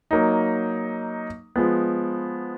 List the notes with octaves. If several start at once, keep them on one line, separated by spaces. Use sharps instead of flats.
F#3 A#3 D#4
F3 G#3 B3